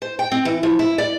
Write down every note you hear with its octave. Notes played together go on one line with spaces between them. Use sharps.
C5
G5
C4
E3
F3
E4
D5